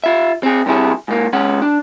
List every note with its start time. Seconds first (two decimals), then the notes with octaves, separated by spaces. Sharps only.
0.04 F4 E5
0.43 C4 G#4
0.66 G2 C3 E4 G#4
1.08 G#2 A#3
1.33 G#3 C#4 F#5
1.62 D4